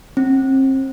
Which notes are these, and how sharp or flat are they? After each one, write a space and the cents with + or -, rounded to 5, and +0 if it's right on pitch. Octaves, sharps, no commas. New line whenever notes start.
C4 +35